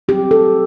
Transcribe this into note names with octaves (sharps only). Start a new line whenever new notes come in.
F#3 C4 G4
A4